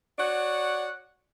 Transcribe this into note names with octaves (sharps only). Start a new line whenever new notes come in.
F#4 C#5 D5 F#5